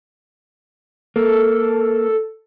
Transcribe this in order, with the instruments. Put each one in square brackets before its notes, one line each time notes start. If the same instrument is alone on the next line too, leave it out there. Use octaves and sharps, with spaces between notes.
[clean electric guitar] A#3 [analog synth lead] A4